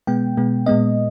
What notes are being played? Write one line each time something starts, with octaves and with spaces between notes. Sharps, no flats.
B2 G#3 B3 G5
B2 G#3 B3
A#2 G#3 B3 D#5